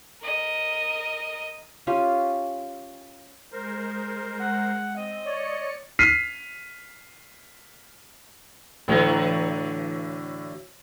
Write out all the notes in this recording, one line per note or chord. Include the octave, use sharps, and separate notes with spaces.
A#4 D#5
C#4 F4 G4 G#5
G#3 A#4 C5
F#5
C4 D#5
C#5 D5 C#7
F6 B6 C7 D#7
A2 D3 E3 F#3